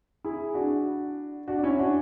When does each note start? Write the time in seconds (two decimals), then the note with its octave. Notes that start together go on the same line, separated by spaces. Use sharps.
0.24 E4 G#4
0.54 D4 F#4
1.48 D4 F#4
1.59 D4
1.63 C#4 E4
1.79 D4 F#4